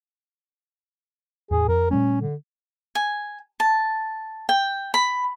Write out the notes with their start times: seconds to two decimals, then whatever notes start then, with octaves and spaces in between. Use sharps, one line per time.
1.51 E2 A2 G#4
1.68 F2 A#4
1.91 A#2 G3 A3 C#4
2.21 D3
2.95 G#5
3.60 A5
4.49 G5
4.94 B5